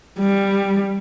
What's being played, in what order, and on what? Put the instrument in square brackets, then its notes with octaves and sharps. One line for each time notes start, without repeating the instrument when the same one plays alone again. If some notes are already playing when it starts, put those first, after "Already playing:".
[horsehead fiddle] G3